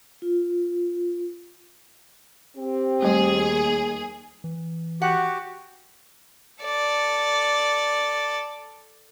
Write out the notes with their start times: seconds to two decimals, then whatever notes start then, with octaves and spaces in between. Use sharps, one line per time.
0.22 F4
2.57 C4 G4
3.02 D#2 G3 A3 G#4
4.44 E3
5.02 F#4 G4 F#5
6.64 A4 D5